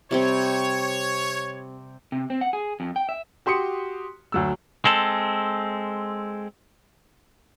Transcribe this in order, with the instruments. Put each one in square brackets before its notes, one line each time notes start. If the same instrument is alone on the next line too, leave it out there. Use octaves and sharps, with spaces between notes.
[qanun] C3 G3 C4 [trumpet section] C#5
[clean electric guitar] C3
C4
F#5
G#4
F2
G5
E5
[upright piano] F#4 G4 C6 D#6 C#7
D2 F#3 E6
[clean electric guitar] G#3 C4 A4